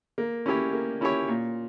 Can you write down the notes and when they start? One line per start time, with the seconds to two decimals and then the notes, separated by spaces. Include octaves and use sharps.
0.18 A#3
0.46 C#4 E4 G4 C#5
0.73 A#3
1.01 C#4 E4 G4 C#5
1.28 A#2